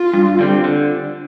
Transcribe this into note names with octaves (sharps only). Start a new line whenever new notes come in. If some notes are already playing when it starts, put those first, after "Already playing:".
Already playing: F4
G2
D3 G3 C4
D3